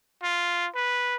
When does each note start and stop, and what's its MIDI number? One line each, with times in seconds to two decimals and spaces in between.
0.23 0.68 65
0.75 1.16 71